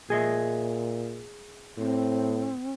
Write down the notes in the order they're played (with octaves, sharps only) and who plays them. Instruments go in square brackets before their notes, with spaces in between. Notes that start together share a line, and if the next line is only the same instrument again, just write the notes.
[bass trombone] A#2 [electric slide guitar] G#4 D#5 E5
[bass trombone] A2 [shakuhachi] C4